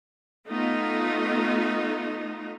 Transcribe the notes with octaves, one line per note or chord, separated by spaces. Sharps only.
A3 B3 D#4 F4